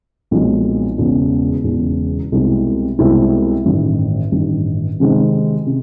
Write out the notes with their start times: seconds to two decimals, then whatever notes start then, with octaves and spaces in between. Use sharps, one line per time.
0.31 B1 A#2 F3 G#3 C4
0.98 E1 E2 C#3
1.64 E1 E2 C#3
2.32 C2 B2 G#3 C4 E4
2.99 C2 B2 G#3 C4 E4
3.66 A1 G2 D#3
4.32 A1 G2 D#3
5.00 C3 D#3 G#3 C4
5.66 C3